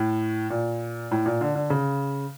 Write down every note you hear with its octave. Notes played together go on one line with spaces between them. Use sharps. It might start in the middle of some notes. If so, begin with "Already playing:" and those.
Already playing: A2
A#2
A2
A#2
D3
D3
C#3